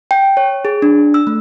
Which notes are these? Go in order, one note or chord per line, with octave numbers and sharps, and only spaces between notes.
G5
C#5
G#4
D4
E6
A3